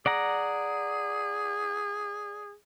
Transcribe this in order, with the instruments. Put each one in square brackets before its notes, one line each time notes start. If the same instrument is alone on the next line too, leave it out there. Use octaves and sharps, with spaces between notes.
[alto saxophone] G#4 [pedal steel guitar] D5 F#5 A#5